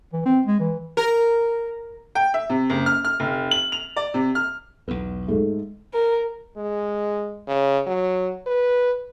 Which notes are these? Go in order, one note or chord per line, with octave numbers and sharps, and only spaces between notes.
E3
C4
G#3
E3
A#4
G5
E5
C3
F#1
F6
F6
F1
F#7
F7
D5
C3
F6
B1 E2 B3
G#2 A3
A#4
G#3
C#3
F#3
B4